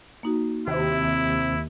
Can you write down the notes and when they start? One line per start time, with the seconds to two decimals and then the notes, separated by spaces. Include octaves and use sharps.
0.23 A#3 D#4 F#4
0.67 D#2 C3 E4